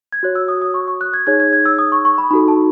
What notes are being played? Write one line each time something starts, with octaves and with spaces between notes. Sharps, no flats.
G#6
F#4 C#5 F#6
E6
D#6
D#6
C#6
C#6
F#6
G#6
D#4 G#4 C#5 G#6
G#6
G#6
E6
D#6
C#6
C#6
B5
D#4 F#4 A4 B5
A5